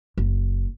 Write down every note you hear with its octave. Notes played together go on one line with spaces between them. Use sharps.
F#1